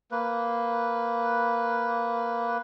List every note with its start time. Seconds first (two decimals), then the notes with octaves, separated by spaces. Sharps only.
0.11 A#3 B4